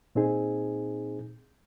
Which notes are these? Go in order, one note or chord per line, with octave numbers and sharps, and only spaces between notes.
A#2 C4 D#4 G#4